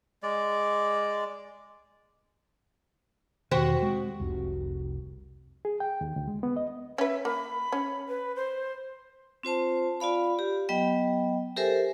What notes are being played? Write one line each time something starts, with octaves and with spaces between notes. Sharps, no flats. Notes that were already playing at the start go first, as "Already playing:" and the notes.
G#3 D5
E2 B2 D#3 F#4 G4 C5
G#3 C4
F1 C2
G#4
G5
D#2
D2
G#3
B3
D#5
C#4 B4 E5
A#3 B5
C#4
B4
C5
C4 F4 C5 A5
F4 D5 F5 B5
G4
F#3 B3 D#5 G5
G4 A4 A#4 C5 E5 G#5